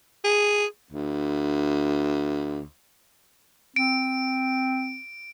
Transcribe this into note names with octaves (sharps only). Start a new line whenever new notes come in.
G#4
D2
C4 D7